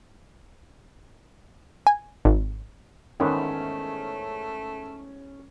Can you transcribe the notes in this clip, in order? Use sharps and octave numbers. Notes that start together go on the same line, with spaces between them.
G#5
G#1
E2 G#2 D#3 A3 C#4 B4